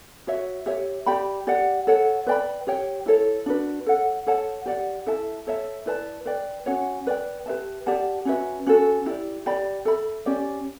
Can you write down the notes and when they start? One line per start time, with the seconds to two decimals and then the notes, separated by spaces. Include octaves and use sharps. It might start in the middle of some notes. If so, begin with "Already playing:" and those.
0.27 F#4 C#5 E5
0.66 G4 C#5 E5
1.06 G4 D5 G5 B5
1.47 G4 D5 F#5
1.87 A4 C#5 F#5
2.27 B4 D5 G5 B5
2.67 G4 C#5 G5
3.06 E4 A4 C#5
3.46 D4 F#4 B4
3.86 A4 C#5 F#5
4.27 A4 C#5 F#5 A5
4.66 G4 D5 F#5
5.06 E4 A4 E5 A5
5.47 A4 C#5 E5 A5
5.86 E4 B4 D5 A5
6.26 B4 D5 G5
6.66 C#4 F#4 C#5 F#5
7.07 B4 D5 G5
7.46 G4 B4 E5 A5
7.86 G4 D5 F#5 A5
8.25 C#4 F#4 B4 E5
8.67 C#4 F#4 A4
9.06 E4 G4 D5
9.46 G4 D5 G5 B5
9.85 A4 E5 B5
10.26 C#4 G4 D5